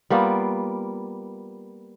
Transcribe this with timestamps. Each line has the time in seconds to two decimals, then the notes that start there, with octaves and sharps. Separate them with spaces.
0.10 G3 A#3 B3 F4